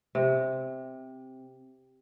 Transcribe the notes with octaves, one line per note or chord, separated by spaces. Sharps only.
C3